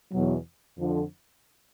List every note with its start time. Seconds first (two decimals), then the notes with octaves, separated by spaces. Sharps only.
0.11 E2 B2 F#3
0.78 F2 D3 F3